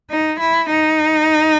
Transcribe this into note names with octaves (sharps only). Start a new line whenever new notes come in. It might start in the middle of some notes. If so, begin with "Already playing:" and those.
D#4
E4
D#4